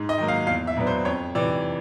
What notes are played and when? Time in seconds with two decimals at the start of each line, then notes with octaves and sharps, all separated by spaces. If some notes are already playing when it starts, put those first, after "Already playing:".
Already playing: G#2
0.09 D#5
0.18 D#3 F#3 A#3
0.28 F5
0.47 E2 F5
0.67 E5
0.77 B2 F#3 B3 D4
0.87 C5
1.05 F2 C#5
1.35 C3 E3 D5